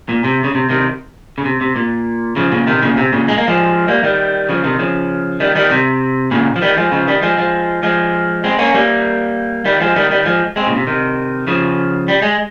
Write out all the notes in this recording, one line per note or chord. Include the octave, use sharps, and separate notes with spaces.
A#2
C3
C#3
C3
C3 D#3
C#3
C3
C3
A#2
C#3 F3
A#2 C#3
C3 D#3
A#2 C#3
C3
A#2 C#3
G#3
A#3
F3 G#3
G3 A#3
D#3 G3
C#3 F3
C3 D#3
C#3 F3
D#3 G3
D#3 G3
C3
A#2 C#3
F3
D#3 G3
F3 G#3
C#3 F3
D#3 G3
F3 G#3
F3 G#3
F3 G#3
G#3 C4
A#3 C#4
G3 A#3
D#3 G3
F3 G#3
D#3 G3
D#3 G3
F3 G#3
G#3 C4
A#2 C#3
C3
C3 D#3
C#3 F3
G3
G#3